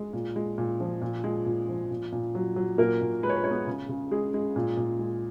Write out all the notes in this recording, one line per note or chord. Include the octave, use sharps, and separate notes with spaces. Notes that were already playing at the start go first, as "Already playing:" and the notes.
Already playing: G#3
A#2
G#3
A#2
F3
A#2
G#3
A#2
F3
A#2
A#2
F#3
F#3
A#2 A#3 A#4
A#2
G#3 B4
C#5
B4
G#3 C#5
B3 B4
C#3
C#3
G#3 G#4
G#3
A#2
A#2
G#3